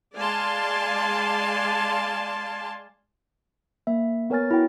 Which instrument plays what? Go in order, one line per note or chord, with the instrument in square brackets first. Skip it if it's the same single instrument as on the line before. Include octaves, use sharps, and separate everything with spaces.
[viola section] G#3 D5 F5 G#5 A5 C6
[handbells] A#3 E5
B3 A#4 C#5 G#5 F6 A6
E4 F#4 G5